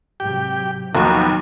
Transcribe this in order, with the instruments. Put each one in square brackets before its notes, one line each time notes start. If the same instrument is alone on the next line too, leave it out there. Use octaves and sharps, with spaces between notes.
[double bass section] G#2 C3 F#3 [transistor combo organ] G4 G5
[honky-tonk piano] D#2 [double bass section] B2 F#3 A#3 [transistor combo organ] F3 B3 [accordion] D#4 F#4